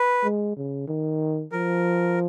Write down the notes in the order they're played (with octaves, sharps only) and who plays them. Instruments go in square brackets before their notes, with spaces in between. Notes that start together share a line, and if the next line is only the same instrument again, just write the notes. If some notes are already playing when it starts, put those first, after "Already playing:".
Already playing: [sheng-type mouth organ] B4
[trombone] G#3
C#3
D#3
[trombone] F3 [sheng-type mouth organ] A#4